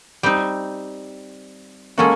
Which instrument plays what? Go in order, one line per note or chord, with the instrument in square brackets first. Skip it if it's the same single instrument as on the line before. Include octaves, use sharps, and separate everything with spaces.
[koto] G3 C4 D#4
[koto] G#3 C#4 F#4 A4 [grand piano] A#3